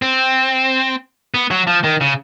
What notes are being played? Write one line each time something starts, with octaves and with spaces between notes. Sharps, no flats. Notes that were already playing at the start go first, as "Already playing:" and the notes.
C4
B3
F#3
F3
D#3
C#3